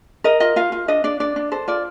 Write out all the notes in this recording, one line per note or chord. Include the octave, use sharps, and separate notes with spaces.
A#4 D#5
F4 D#5
F4 F5
F4
D4 D#5
D4 D5
D4 D5
D4
A4 C5
F4 D5